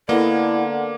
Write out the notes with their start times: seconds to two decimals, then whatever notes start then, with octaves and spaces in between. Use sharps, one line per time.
0.09 D3 A#3 B3 E4 D#5 F5